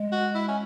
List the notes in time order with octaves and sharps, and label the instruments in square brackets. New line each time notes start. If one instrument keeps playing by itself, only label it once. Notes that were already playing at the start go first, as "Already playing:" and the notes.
Already playing: [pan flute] G#3
[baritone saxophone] F#4
E4
C#4